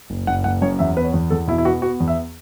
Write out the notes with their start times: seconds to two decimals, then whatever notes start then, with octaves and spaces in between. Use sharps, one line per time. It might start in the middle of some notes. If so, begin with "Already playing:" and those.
0.10 F#1
0.27 F#1 F#5
0.44 F#1 F#5
0.62 F#2 C#5
0.79 E2 E5
0.97 B3 B4
1.04 C#5
1.14 E2
1.30 E2 A4
1.47 B2 E4
1.58 E4
1.65 B3 F#4
1.82 B3 F#4
2.00 E2
2.08 E5